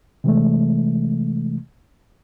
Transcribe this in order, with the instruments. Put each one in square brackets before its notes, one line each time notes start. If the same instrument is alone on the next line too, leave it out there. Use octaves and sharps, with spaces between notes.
[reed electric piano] C3 E3 G#3 A3